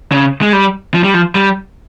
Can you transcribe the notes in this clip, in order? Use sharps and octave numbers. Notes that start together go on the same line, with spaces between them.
C#3
G#3
G3
F3
G3
F3
G3